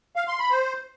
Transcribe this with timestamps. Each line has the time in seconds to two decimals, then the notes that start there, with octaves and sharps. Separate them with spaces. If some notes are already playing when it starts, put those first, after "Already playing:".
0.16 F5
0.28 C6
0.39 B5
0.51 C5